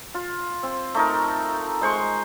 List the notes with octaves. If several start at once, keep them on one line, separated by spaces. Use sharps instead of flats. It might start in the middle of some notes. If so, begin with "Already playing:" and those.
F4
C4
A3 D#4 A#4
G#3 C5 C#6